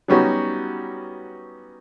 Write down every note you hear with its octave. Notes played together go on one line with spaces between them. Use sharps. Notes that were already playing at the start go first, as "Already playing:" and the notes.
F#3 G3 B3 C#4 D#4 F#4